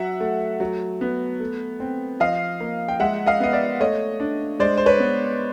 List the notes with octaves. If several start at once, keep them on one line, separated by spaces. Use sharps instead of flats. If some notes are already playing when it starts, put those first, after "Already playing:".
Already playing: F#3 E5 F#5
A3
F#3
B3
A3
C4
F3 D#5 F5
A#3
G5
G#3 E5 F#5
D#5 F5
B3 D#5
D5 E5
A3 C#5 D#5
D4
G#3 C5 D5
C5
B4 C#5
B3